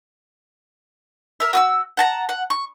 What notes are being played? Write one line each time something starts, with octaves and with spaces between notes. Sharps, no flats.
A#4 E5
F#4 D#6 E6
F#5 A5 A#5
F#5
C#6